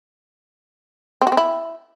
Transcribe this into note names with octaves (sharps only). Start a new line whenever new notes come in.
C4
F#4
C4
E4